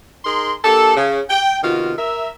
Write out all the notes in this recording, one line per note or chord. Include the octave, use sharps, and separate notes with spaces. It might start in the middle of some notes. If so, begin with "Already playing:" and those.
D#4 G#4 A#4 C6
A#3 D4 G4 A4
C#3
G5
C3 D#3 B3 F4 F#4
A#4 E5